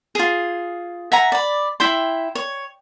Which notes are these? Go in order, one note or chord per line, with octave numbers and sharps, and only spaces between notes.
F4 G#4
E5 F#5 G#5 A#5
D5 B5
E4 E5 G5 C6
C#5